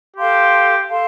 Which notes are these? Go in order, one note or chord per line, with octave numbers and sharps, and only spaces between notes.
G4 A4 F5 A5 C6
A4 F5 A5 C6